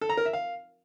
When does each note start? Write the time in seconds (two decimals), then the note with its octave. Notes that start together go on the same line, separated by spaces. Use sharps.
0.01 A4
0.09 A#5
0.17 A#4
0.25 E5
0.33 F5